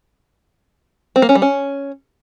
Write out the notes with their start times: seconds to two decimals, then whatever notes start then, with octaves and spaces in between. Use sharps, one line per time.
1.16 C4
1.22 A#3
1.29 C#4
1.35 G3
1.42 C#4